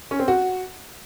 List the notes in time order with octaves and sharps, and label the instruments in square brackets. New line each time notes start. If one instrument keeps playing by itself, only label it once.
[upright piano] C#4
C4
F#4